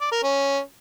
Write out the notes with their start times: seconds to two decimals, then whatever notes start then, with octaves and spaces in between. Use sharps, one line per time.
0.01 D5
0.12 A#4
0.23 C#4